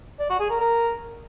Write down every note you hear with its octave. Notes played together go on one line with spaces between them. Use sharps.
D5
F#4
G#4
A#4
A#4